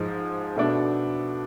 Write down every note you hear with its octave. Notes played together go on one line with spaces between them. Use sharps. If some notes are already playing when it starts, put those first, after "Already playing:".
Already playing: G#2 F3 G#3
B2 A3 D4